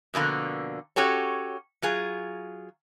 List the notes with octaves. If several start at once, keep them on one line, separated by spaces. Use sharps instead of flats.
F2 B2 D3 A#3
C#4 F#4 G4 A4 C#5
F#3 F4 G#4